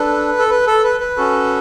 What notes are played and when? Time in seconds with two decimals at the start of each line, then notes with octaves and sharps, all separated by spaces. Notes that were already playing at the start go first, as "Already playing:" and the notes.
Already playing: D4 A4 B4
0.39 A4
0.50 B4
0.67 A4
0.84 B4
1.00 B4
1.17 C#4 F#4 A4